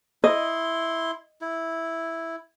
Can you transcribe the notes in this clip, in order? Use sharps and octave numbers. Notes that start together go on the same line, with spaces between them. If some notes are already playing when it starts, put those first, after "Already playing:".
E4 D#5 C6
E4